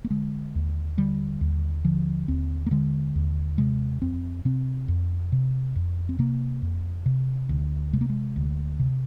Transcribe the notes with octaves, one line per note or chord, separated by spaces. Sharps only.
A#3
D3 G#3
D#2
D3 G3
D#2
D3 F3
D#2 C4
A#3
D3 G#3
D#2
C3 G#3
F2 C4
C3 C4
F2
C3
F2
C4
C3 A#3
F2
C3
D2
C3 G#3
A#3
G#3
D2
C3